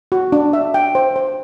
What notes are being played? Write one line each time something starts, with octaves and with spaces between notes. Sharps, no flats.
F#4
D4
E5
G5
C5
C5